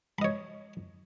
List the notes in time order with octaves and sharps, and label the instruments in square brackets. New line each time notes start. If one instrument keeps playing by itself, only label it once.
[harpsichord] B5
D#5
C#5